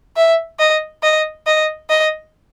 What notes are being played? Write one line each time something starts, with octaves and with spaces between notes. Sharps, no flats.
E5
D#5
D#5
D#5
D#5